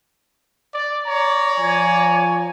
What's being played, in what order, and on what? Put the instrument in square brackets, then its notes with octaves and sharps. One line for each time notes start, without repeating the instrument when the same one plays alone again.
[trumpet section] D5
C#5 D5 A#5
[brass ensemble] F3 G#5